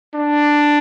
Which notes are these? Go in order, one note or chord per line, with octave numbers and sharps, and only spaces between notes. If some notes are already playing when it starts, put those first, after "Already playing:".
D4